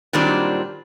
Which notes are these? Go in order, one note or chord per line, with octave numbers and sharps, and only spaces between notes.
A#2 D#3 F#3 G3 C4 D4